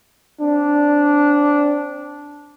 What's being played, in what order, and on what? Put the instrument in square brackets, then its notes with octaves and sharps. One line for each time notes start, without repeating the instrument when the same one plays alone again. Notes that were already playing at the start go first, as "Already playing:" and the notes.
[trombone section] C4 D4